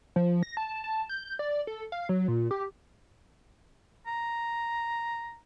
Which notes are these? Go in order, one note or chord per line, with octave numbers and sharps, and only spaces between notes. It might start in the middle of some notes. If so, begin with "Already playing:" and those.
F3
A#6
A5
A5
G6
D5
A4
F5
F#3
A#2
G4
A#5